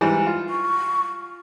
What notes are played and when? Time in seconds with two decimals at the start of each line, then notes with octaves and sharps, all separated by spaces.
0.01 G#2 E3 G3
0.27 F4
0.49 C#6